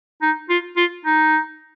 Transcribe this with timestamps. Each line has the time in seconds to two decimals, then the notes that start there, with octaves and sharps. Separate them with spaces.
0.22 D#4
0.49 F4
0.77 F4
1.05 D#4